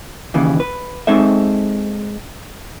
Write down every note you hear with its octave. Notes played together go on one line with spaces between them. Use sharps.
D#2 C#3 E3
B4
G#3 C4 D#4 A4 E5